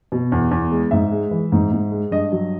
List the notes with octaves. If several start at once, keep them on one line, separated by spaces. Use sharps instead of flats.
B2
E2
E2
G#3
G#2 E5
G#3
E3
G#2
G#2
G#3
G2 D#5
F#3